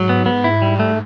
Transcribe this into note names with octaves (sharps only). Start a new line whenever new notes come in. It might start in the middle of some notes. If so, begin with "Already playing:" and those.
Already playing: G#2 F#3
B3
B3
E4
G3
A3